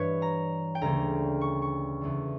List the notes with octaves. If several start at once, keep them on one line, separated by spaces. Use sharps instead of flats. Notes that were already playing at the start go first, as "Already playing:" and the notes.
Already playing: G2 E3 G3 B4 C#5
A#5
G5
D2 C#3 G3 A#3 C#4 A#5
C#6
C#6
E2 C#3 G3